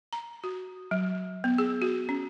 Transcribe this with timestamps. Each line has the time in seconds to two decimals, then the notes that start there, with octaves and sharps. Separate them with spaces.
0.13 A#5
0.44 F#4
0.91 F#3
1.44 B3
1.58 G#4
1.82 F#4
2.09 C#4